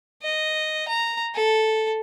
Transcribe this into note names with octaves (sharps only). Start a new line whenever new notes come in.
D#5
A#5
A4